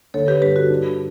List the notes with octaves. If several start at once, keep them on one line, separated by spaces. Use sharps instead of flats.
D3 A4 C#5
G4 B4
G2 G4 B4
F#4 A4
D4